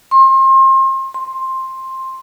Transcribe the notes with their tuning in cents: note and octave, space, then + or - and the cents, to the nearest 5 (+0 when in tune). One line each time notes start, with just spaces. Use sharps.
C6 +35
C6 +10